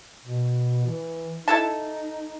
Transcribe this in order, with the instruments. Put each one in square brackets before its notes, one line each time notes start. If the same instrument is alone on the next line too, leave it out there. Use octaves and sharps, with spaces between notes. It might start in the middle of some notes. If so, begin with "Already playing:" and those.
[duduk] B2
E3
[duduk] D#4 [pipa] E4 A4 A5